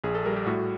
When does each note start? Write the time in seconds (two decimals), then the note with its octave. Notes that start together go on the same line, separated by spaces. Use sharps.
0.04 A#1 G#4
0.15 A4
0.25 G3 A#4
0.36 G4
0.46 A2 F#4